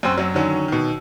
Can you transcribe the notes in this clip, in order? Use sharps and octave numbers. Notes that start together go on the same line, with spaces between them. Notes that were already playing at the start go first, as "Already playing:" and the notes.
F#2 C4 F#4 E6
F#2 F#3
D3 D#3 F#3 C#4
B2 D#3